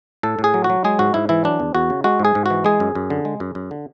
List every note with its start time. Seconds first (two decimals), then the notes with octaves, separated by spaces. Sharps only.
0.23 A2 A4
0.39 A2
0.44 G#4
0.54 F#3
0.64 F#4
0.70 F#3
0.84 G#3 G#4
0.99 G#2 F#4
1.14 G#2 E4
1.29 E3 E4
1.44 F#3 D4
1.60 E2
1.75 E2 F#4
1.90 C#3
2.04 G#3 F#4
2.20 G#2
2.25 G#4
2.35 G#2
2.46 E3 F#4
2.65 G#3 G#4
2.80 F#2
2.95 F#2
3.10 D3
3.25 G#3
3.40 F#2
3.55 F#2
3.71 D3